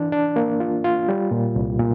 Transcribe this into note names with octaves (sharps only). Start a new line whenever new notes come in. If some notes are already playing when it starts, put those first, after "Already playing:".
Already playing: E3 D4
D4
A#3
F4
F4
G3
A#2
C2
A#2